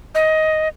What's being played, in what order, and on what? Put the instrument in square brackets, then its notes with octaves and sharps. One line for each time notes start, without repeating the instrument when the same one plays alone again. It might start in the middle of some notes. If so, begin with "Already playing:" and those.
[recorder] D#5